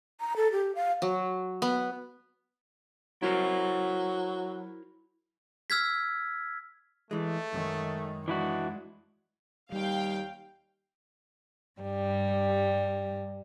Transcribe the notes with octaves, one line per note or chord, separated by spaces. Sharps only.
A#5
A4
G4
F5
F#3
B3
F#3 E4 A#4 C5
E6 F6 G#6 B6
E3 G#3 A3
F#2 D#3 G#3
E3 G#3 D4 E4 F#4
D#2 G3 F5 G5
G2 G3